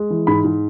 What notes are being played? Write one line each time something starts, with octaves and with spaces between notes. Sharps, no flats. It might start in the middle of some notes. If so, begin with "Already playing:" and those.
Already playing: G#3
E3
G#2 B5
G#2